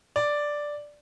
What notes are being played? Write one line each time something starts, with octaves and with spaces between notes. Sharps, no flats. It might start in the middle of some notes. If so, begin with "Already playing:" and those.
D5